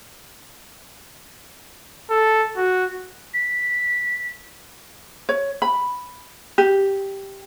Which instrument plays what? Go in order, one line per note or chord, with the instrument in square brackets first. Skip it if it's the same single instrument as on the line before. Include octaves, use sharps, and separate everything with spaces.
[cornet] A4
F#4
[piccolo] B6
[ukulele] C#5
B5
G4